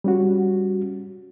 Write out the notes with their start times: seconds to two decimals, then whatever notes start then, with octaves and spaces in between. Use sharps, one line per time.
0.04 G3 C#4 F#4